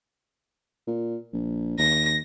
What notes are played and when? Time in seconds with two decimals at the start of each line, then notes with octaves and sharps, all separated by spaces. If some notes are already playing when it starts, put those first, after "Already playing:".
0.87 A#2
1.33 A#1
1.79 D#2 A#6